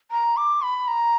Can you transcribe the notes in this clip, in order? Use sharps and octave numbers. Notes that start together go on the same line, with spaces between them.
A#5
D6
B5
A#5